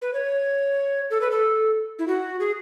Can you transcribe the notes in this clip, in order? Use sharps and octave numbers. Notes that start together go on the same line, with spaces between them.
B4
C#5
A4
B4
A4
E4
F#4
G#4